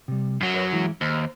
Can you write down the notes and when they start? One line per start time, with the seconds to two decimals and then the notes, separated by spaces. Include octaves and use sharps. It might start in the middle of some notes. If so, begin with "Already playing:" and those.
0.08 C3 G3
0.41 F#2 F#3
0.54 A#4 B4 C#5
0.73 E3 G#3 E4
1.01 D#2 C5 A5 A#5